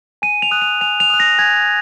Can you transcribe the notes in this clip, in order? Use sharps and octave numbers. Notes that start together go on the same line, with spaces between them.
G#5 D#7
F7
D#6 F#6
F7
G#5 F7
F7
D#6 F#6
A#6
G#5 G#6